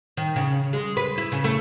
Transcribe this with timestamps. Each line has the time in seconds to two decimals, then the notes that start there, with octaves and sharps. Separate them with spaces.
0.17 D#3
0.36 C#3
0.73 G#3
0.97 B4
1.18 E4
1.32 C#3
1.44 A3